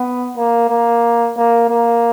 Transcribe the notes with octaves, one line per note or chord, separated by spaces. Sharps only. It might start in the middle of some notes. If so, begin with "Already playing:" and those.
Already playing: B3
A#3
A#3
A#3
A#3